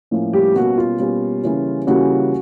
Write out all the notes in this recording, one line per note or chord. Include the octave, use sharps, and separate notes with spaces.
A2 F3 A#3 C#4
G3 G4
B2 G3 A#3 C#4 F#4
F4
B2 G3 A#3 C#4
C#3 E3 G3 A#3 C#4
C#3 E3 G3 A#3 C#4 F#4